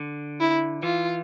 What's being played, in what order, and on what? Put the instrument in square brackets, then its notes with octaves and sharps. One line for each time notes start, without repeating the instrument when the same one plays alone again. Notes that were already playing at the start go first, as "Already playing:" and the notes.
Already playing: [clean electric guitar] D3
[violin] E4
[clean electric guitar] E3 [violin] F4